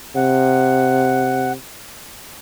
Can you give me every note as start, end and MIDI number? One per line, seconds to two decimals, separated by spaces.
0.16 1.54 48
0.16 1.52 78